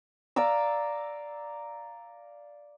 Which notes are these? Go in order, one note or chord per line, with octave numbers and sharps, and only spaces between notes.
D5 F5 A#5 E6